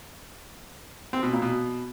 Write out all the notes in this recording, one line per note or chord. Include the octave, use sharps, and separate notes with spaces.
C4
B2
A#2
B2